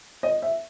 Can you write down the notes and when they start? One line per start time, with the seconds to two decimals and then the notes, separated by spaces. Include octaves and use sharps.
0.23 D#5
0.42 E5